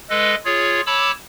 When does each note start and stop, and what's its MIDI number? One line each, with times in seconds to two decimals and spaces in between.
0.10 0.35 56
0.10 0.35 69
0.10 0.35 71
0.10 0.35 75
0.45 0.81 65
0.45 0.81 68
0.45 0.81 73
0.87 1.11 73
0.87 1.11 81
0.87 1.11 83
0.87 1.11 86
0.87 1.11 88